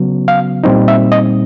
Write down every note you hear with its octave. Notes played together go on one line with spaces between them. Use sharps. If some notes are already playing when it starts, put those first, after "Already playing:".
Already playing: C#3 F#3 B3
F5
A#2 G3 C4 D#4
E5
D#5